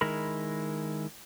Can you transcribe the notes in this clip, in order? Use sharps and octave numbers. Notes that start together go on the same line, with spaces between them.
D#3 G#3 E4 A#4 B5